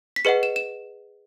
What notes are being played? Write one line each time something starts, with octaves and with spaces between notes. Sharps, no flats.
B6
G#4 B4 D#5 F#5 C#7
E7
E7